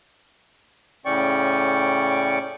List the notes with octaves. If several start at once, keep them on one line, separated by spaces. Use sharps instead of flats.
A2 C#3 C#4 D5 G5 C#6